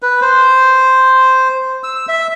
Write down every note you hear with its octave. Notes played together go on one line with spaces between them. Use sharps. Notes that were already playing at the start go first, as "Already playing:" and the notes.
B4
C5
E6
E5